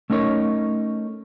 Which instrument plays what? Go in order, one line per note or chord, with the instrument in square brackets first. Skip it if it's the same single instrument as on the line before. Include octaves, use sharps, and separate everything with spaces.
[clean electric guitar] A3 C#4 D#4 A#4 C#5